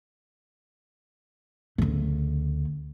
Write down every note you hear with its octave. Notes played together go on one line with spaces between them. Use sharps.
D2 C#3